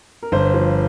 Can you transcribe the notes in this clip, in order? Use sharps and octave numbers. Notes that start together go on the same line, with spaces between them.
A#4
G1 C5
F3